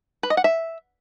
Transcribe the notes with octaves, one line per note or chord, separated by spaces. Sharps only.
B4
D#5
F#5
E5